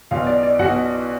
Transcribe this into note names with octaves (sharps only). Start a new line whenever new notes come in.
B1 B2 F4 F5
D5
D5
B1 B2 F#4 F#5